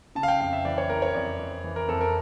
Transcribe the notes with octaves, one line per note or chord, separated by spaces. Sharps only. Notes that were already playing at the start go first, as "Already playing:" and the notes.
C#3 A5
F5
G5
F2 F5
E5
E3 D5
C#5
E3 A#4
C#5
F2 D5
F2
E3
A#4
F2 A4
A#4